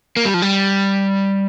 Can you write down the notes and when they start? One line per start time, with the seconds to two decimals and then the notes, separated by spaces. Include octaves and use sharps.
0.17 A#3
0.25 G3
0.34 F3
0.42 G3